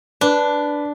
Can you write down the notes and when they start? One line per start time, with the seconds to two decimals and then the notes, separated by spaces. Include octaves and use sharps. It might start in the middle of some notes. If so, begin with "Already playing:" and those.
0.21 D4 B4